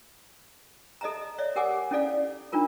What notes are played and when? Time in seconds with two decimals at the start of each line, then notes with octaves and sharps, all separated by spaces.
1.01 A4 D#5 E5 A5 A#5
1.38 C#5 D5 E5
1.56 G4 A#4 F#5 G#5 D6
1.91 C#4 E4 A4 D5 F5
2.52 D4 D#4 F4 A#4 A#5